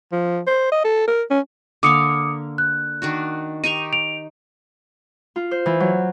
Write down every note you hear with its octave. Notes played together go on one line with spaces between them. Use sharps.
F3
C5
D#5
A4
A#4
C#4
D3 A#3 F5 D6 D#6 C#7
F#6
D#3 D4 F#4
D#4 G4 C#6 D#7 F7
D7 F7
F4
C5
E3
F#3